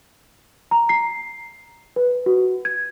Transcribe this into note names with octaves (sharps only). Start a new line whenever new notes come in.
A#5
C7
B4
F#4
G#6